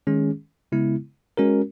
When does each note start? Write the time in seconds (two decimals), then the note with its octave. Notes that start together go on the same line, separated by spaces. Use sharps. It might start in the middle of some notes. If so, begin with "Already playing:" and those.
0.07 D#3 G#3 C#4 G#4
0.72 C#3 G#3 B3 E4
1.37 G#3 C#4 F#4 A#4